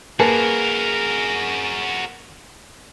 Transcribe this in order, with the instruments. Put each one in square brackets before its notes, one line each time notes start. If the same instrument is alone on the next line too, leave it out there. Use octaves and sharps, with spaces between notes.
[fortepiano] A#3 B4 A5 [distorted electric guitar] F#4 A#4 [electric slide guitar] G#4